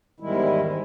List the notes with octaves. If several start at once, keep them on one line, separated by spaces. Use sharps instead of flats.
E2 G#2 D#3 G3 G#3 E4